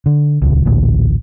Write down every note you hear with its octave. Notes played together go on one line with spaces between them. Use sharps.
D3
D#1 C#2
A1 D2 A#2